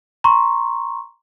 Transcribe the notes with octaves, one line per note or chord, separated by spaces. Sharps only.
A#5 C6 C#6